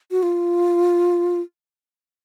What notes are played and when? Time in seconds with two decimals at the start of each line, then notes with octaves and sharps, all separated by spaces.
0.11 F#4
0.23 F4